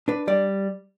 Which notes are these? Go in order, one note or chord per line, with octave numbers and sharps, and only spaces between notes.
D4 B4
G3 D5